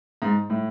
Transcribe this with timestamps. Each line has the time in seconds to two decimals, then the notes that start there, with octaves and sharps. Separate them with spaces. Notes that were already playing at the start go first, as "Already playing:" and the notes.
0.22 G#2
0.50 A2